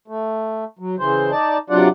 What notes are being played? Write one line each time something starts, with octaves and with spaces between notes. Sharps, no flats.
A3
F#3
C#3 E3 C5
D#4 D5 A5
C3 F#3 D4 F4 D5 F#5